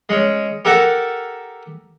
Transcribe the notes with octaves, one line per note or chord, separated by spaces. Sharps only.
G#3 C#4
G4 A4 A#4 E5 F#5